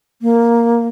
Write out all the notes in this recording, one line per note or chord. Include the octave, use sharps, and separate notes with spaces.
A#3